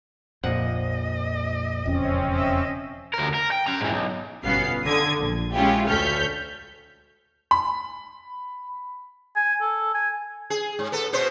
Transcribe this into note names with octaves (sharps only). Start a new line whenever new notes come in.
A#1 F2 A#2 F3 D#5 F#5
E1 F2 C#3 C4 C#4
D#5 E5
D2 A#4
A#4
G5
C#4 A#5
G#2 E3
B1
G1 B2 B3 C#4 F5 C7
D3 D#6 G#6
A#1
G#3 C#4 E4 F4 G4
D2 A4 C#5 F6 G6 B6
B5
G#5
A4
G#5
G#4
G#2
B3 A4
B2 B3 C5